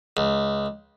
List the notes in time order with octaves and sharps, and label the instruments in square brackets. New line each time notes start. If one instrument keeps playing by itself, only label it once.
[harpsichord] C#2